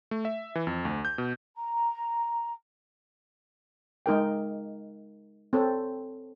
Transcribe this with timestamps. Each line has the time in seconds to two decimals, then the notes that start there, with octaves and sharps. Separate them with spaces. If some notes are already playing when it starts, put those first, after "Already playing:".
0.11 A3
0.25 E5
0.55 E3
0.67 F2
0.85 D2
1.05 G6
1.18 B2
1.56 A#5
4.06 G#3 D#4 A#4 G5
5.53 C4 A4 C#5